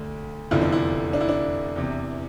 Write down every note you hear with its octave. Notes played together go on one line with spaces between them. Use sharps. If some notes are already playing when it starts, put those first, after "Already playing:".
Already playing: D2 D3
F1 E2 D3 F3 E4
D4
E4
D4
E4
D4
E2 C3 E3